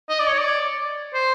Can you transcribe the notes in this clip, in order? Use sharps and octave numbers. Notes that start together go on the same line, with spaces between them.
D#5
D5
C#5
D5
C5